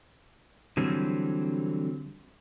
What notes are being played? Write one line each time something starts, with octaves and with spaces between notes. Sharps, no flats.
D3 E3 F#3 G3 C4